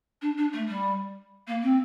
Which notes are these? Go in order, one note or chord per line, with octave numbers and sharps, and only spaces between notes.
D4
D4
A3
G3
A#3
C4